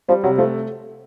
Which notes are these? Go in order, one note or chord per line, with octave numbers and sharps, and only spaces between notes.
F3 G3
C3 F#3
F3 A3